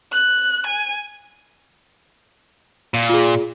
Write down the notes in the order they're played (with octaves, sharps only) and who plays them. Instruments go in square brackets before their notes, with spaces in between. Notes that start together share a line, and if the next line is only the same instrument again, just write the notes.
[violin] F#6
G#5
[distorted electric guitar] A#2
[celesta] F4 G#4